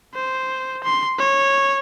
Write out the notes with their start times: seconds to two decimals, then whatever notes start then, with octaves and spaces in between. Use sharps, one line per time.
0.14 C5
0.84 C6
1.19 C#5